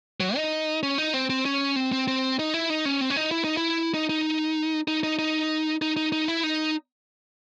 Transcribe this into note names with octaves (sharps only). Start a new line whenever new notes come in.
F#3
D#4
C#4
D#4
C4
C4
C#4
C4
C4
C4
D#4
E4
D#4
C#4
C4
C#4
D#4
E4
D#4
E4
D#4
D#4
D#4
D#4
D#4
D#4
D#4
D#4
E4
D#4